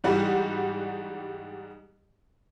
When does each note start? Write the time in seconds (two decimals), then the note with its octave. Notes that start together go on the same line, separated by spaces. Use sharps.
0.04 G#2 E3 G3 D#4 F#4 G4